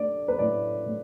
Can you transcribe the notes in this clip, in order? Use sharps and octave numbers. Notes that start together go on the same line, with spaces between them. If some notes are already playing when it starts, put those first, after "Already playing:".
Already playing: A3 D4 D5
B4
A2 D5
A2